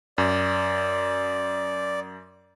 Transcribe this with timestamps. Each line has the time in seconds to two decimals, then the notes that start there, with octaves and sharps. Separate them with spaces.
0.18 F#2 D5